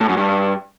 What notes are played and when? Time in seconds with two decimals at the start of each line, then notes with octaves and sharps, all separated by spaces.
0.01 A2
0.09 F#2
0.17 G2